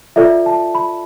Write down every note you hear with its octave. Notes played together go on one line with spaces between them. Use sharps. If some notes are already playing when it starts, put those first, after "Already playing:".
F4 A4 D5 E5
A5
B5